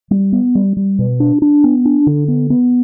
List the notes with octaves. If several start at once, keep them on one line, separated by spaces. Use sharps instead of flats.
G3
B3
G3
G3
B2
D4
D4
B3
D4
D3
B3
B3